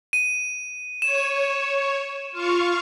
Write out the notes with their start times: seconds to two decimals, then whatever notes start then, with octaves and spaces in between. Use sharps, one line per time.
0.13 D#7
1.02 C#5 E7
2.32 F4 F5 C#6